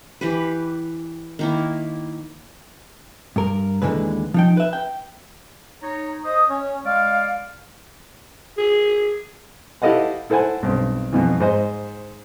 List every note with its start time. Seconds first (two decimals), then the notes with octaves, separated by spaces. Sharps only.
0.21 E3 G4 B4
1.39 D#3 A#3 E4
3.36 G2 A#4
3.82 D#2 A#2 D3 E3 G#3 B4
4.34 F3 D#4 G5
4.57 B4 E5
4.73 G5
5.83 D#4 C#5 A#5
6.25 C5 D#5 D#6
6.50 C#4 C#5
6.86 G#3 D5 F5
8.58 G#4
9.82 E4 G4 A4 D#5 F5 F#5
10.30 E4 A4 C5 F#5 G#5
10.63 B1 G2 C4
11.13 F2 B2 E3
11.40 G#2 C5 D#5